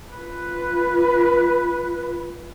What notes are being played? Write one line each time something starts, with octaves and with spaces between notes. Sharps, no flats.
F4 B4